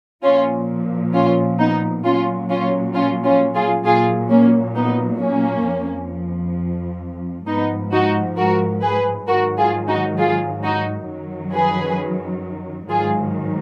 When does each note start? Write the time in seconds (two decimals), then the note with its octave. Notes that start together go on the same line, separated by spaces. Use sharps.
0.23 A#2 F3 C#4 F4
1.13 C#4 F4
1.58 B3 D#4
2.04 A#2 F#3 C#4 F4
2.49 C#4 F4
2.95 C#4 F4
3.24 C#4 F4
3.55 F4 G#4
3.84 A#2 F#3 F4 G#4
4.30 A#3 C#4
4.75 B3 D#4
5.20 A#3 C#4
5.66 F2 F3
7.46 G#2 F3 B3 D#4
7.92 D#4 F#4
8.37 F#4 A#4
8.83 G#4 B4
9.27 G#2 D#3 F#3 F#4 A#4
9.58 F4 G#4
9.88 D#4 F#4
10.18 F4 G#4
10.63 D#4 F#4
11.09 F#2 D#3 F#3
11.53 G#4 B4
12.89 G#2 D#3 F#3 F4 G#4